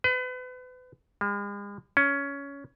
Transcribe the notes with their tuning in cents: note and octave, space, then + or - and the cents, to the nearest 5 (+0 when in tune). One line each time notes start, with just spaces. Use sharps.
B4 +35
G#3 -45
C#4 +15